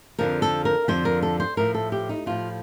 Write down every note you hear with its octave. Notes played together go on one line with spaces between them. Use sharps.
F2 D3 F3 A#4
A4
A#4
F2 D3 F3 C5
A#4
A4
C5
A2 F3 A#4
A4
G4
D#4
A2 F3 F4